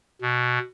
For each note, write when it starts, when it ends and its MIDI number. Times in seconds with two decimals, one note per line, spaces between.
0.22 0.59 47